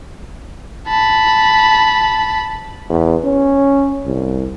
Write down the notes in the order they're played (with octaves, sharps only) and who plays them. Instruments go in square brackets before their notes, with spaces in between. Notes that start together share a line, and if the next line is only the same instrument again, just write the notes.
[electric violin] A5 B5
[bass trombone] E2
C#4
C2